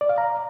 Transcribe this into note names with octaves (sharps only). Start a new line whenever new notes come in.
D5
F5
A#5